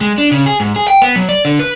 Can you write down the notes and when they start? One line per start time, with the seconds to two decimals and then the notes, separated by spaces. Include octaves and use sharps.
0.01 G#3
0.18 D4
0.31 C#3
0.46 G#4
0.60 G#2
0.76 G#4
0.88 G5
1.02 B3
1.16 F#3
1.29 D5
1.45 D3
1.59 B4